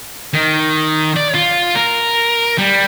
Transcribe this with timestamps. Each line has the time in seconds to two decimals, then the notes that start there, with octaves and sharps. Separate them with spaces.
0.34 D#3
1.16 D5
1.34 F4
1.75 A#4
2.58 G3